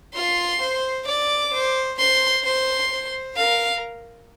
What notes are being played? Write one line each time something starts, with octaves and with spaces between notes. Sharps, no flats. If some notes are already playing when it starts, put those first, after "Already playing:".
F4 C6
C5
D5 D6
C5
C5 C6
C5 C6
C5
A#4 F5